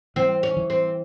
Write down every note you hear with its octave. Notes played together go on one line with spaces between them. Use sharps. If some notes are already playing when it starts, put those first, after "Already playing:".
E3 C4
C#4
E3
C4